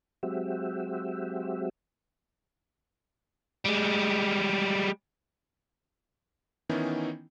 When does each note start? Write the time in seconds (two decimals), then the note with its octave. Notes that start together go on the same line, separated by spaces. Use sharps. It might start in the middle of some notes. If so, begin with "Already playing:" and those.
0.23 F#3 G#3 C4 F#4 G4 E5
3.65 G3 G#3
6.69 D#3 E3 B3 C#4 D#4 E4